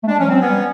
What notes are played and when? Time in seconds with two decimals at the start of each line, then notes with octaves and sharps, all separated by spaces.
0.03 A3
0.07 G#3 D4
0.19 F3 C#4
0.27 F#3 C4
0.41 B3 C#4
0.47 G3